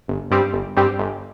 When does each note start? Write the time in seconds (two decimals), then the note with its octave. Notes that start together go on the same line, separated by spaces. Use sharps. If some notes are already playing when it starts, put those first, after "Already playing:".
0.08 G1
0.31 G2 G3 C4 G4
0.54 G1
0.77 G2 G3 C4 G4
0.99 G1